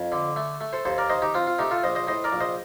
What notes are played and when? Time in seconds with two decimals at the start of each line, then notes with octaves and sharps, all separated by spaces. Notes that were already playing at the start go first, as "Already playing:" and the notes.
Already playing: F2
0.12 D3
0.36 A3
0.61 A3
0.73 A4 C5
0.85 D#2 A4 C5
0.98 A#4 D5
1.10 D#3 C5 D#5
1.22 D#4 G4
1.34 C4 F4
1.47 F4
1.59 A3 D#4 G4
1.71 F4 A4
1.83 A#1 C5 D#5
1.95 C5 D#5
2.07 A2 C5 D#5
2.24 A#4 D5
2.33 A#1
2.40 C5 D#5